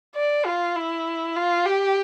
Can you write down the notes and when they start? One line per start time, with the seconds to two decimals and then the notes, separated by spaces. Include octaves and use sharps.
0.16 D5
0.46 F4
0.76 E4
1.36 F4
1.66 G4